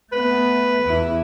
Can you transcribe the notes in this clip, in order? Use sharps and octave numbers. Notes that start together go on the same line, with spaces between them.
A3 B3 B4
E2 E4